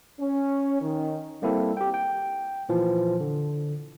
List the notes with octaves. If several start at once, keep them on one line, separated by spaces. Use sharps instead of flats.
C#4
D#3
G3 A#3 C4 E4 A4
G4 G5
G5
A#2 E3 F3
D3